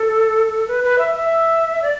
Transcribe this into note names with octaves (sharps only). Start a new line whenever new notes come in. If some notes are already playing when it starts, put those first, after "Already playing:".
Already playing: A4
B4
B4
E5
E5
D5